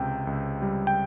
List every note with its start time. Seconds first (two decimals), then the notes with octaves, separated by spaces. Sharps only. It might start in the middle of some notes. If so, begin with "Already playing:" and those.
Already playing: C#2 C3 G5
0.27 C#2
0.62 G3
0.87 G5